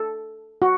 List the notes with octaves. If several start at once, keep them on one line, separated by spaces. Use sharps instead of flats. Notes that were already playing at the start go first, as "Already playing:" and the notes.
Already playing: A4
F#4